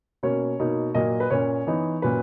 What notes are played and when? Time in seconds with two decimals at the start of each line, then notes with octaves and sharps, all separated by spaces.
0.23 B2 A#3 C#4 C#5
0.60 B2 A#3 D#4
0.95 A#2 F#3 A#3 D#5
1.20 B4
1.30 A#2 A#3 C#4 C#5
1.67 E3 B3 D#4
2.02 A#2 F#3 C#4 B4